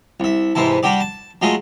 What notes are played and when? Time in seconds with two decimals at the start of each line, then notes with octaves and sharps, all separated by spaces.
0.20 C2 E5
0.55 G#2 C3 E3 E4 A5
0.83 G3 D4 F#4 G4 D5
1.00 A5
1.42 F#3 G#3 A3 F4 G#4 D#5